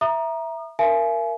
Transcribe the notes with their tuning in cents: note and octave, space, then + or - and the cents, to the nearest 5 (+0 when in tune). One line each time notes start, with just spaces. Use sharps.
E5 +0 A#5 +15 D#6 -35
A#4 +0 E5 +45 G#5 +30